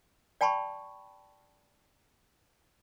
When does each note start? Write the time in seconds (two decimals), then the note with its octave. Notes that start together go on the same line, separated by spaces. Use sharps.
0.41 D5 G5 A5 B5 C#6